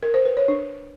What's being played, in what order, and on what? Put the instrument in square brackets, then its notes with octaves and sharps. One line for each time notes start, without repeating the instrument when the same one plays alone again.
[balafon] A#4
C5
B4
C#5
D4